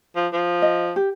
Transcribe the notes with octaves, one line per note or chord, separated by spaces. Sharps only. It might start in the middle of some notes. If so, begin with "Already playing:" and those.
F3
F3
D#5
G4